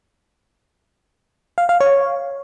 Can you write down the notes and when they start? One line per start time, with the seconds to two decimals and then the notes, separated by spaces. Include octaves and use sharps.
1.58 F5
1.69 F5
1.81 C#5